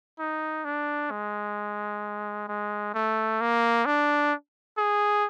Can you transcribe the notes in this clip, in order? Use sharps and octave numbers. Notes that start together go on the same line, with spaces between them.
D#4
D4
G#3
G#3
A3
A#3
D4
G#4